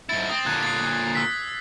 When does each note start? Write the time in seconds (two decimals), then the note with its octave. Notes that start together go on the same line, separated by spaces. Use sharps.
0.09 G#2 E4 A6
0.30 C4 D#6
0.46 A#2 D3 F#6 G#6
0.63 A6 C7
1.15 E6 A6 B6